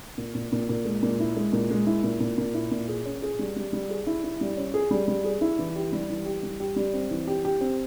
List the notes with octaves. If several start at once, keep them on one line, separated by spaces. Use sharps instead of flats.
A#2
A#2
A#2
A#2
G#3
A#2
E4
G#3
A#2
G#3
E4
A#2
A#2
A#2
E4
A#2
G#4
C#4
G#4
G3
G3
G3
G#4
E4
E4
G3
C#4
G#4
G3
G3
G#4
E4
E3
G4
G3
E3
G4
G3
G4
G3
C4
E3
G4
G4
C4